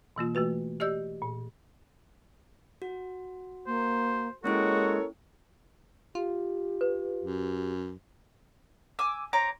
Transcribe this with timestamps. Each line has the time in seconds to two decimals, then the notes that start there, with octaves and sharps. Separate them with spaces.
0.16 B2 E3 A#3 F4
0.35 E3 A3 F#4 B4
0.80 G4 D5 D#5 E6 G6
1.22 A#2
2.82 F#4
3.67 A#3 C5
4.44 G#3 A#3 C#4 E4 F#4 A4 A#4 C#5
6.15 F4 G4
6.81 B4
7.24 F#2
8.99 G#5 D6 E6
9.33 C4 C#5 A#5 D6